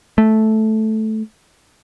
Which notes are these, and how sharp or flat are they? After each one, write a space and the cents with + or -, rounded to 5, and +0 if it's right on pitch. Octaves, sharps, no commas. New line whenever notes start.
A3 -10